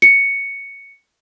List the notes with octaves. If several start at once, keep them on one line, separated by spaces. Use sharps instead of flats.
C#7